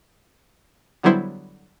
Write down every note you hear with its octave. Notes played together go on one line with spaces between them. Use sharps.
D3 F#3 G3 B3 E4 C5